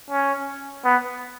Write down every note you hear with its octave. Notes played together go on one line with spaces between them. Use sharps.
C#4
B3